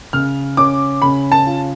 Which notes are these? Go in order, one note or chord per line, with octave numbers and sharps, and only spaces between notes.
C#3 F6
C#4 D6
C#3 B5
A5
F4